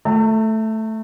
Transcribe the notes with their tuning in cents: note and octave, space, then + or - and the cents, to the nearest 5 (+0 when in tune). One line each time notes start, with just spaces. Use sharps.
A3 +0 A5 +45